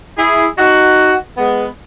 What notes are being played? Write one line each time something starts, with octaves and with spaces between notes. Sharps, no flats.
E4 G#4
D#4 F#4
G#3 B3